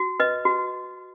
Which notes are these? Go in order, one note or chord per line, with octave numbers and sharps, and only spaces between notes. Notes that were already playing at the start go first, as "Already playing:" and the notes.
Already playing: F#4
B4 D#5
F#4